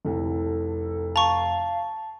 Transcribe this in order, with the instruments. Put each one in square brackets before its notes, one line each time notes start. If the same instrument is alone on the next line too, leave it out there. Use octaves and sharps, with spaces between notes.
[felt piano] F1 C2 [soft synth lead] A4
[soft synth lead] F5 [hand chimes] A5 [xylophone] A#5 C#6